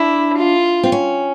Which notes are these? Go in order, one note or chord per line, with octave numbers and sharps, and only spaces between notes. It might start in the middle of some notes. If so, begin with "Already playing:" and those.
Already playing: D4 E4
F4
C4
C#4